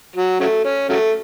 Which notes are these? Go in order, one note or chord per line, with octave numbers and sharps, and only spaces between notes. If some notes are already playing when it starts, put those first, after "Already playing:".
F#3
C#3 F#3 A3
C#4
C#3 F#3 A3